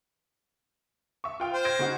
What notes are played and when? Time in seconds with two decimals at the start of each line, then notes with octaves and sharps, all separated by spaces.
1.24 E5 C#6
1.40 F4 G5 F6
1.52 C5
1.65 G#6 A#6 D7
1.79 C#3 D#4 F#4